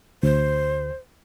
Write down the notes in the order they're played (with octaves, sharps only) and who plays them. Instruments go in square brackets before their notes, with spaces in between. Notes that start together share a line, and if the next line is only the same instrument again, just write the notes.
[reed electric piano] D2 [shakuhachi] C5